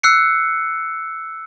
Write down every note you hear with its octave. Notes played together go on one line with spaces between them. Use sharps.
E6 F#6 C7 C#7